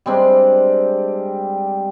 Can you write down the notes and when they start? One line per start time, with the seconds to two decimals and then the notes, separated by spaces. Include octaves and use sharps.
0.06 G3 G#3 C4 D4